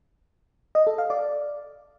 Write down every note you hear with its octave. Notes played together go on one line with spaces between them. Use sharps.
D#5
A4
F5
D5